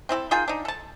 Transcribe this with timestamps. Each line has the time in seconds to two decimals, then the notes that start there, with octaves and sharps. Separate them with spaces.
0.09 C4 E4 G#4 A4
0.31 D#3 F4 G#4 G5
0.48 D4 D#4
0.65 A4 A5